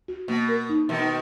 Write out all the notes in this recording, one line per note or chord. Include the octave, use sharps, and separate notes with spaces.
F#4
B2 A#3
A#4
D#4
B2 D#3 E5